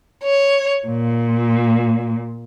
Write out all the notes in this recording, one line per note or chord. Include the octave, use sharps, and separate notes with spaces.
C#5
A#2